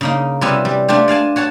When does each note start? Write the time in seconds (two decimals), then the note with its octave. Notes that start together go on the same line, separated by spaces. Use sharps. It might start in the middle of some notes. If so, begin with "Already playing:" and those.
0.01 C#3 A#3 D#4
0.41 C3 G3 B3 C#4 E4 F#4
0.65 G3
0.88 A3 D4 F4 G4
1.08 D5 F5 G#5 A5
1.36 F#4 C#5 F#5 A5